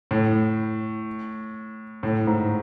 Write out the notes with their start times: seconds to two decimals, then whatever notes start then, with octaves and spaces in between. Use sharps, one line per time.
0.11 A2
2.03 A2
2.27 G#2